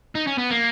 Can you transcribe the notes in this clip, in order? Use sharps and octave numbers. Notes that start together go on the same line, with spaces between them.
D#4
C#4
B3
A#3